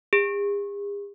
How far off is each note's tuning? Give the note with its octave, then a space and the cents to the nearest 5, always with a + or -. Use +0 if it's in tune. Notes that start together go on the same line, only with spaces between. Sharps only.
G#4 -45